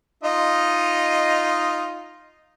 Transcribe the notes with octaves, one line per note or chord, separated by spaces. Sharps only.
D#4 F4 D#5